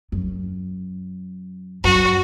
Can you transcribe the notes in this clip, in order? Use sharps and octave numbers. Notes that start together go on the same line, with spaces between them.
F#2
F#2 F#4